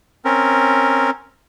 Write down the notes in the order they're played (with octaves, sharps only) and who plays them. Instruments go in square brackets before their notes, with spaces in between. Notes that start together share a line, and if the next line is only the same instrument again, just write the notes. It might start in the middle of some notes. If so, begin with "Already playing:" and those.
[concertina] C4 C#4 A#4